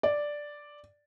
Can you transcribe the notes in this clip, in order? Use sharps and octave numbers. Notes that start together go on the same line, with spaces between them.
D5